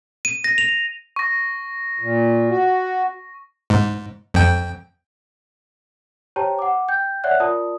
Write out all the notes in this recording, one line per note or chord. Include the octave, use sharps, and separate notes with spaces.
D#7
A#6
F7
C#6 A#6
A#2
F#4
G#2
F2 G5
G4 C5 C#5 G5 A5 A#5
F#5 D6
G5 G6
C#5 D5 E5 F#5 F#6
F4 A#4 D5 A5 D#6